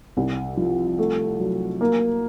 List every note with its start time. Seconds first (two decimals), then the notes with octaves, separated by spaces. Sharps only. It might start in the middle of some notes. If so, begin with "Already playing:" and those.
0.17 C2
0.57 F3
0.99 A3
1.39 F#3
1.81 A#3